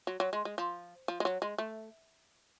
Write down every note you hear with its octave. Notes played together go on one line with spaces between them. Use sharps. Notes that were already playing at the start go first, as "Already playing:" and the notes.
F#3
F#3
G#3
G#3
F3
F3
G#3
F#3
G#3
A3